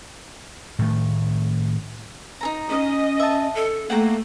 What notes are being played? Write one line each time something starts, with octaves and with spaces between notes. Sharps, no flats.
A2 D#3 A3
D#4 A4 A#5
C#4 D#5
E5 A5
A4
A3 A#3 F#5 G5 A#5